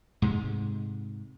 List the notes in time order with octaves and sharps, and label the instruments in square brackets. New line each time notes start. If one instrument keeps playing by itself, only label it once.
[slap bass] G#2 C3 G#3